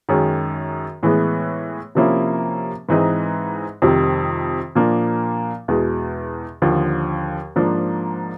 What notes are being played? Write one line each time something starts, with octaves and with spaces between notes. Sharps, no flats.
F#2 D#3 G#3 C#4
A2 E3 G#3 B3
C3 F3 A#3 C#4 E4
G#2 E3 G#3 C4 D#4
F2 C3 D#3 G3 C4
A#2 F3 A#3 D4
E2 B2 G#3
D#2 D3 F3
G#2 F3 A#3 D4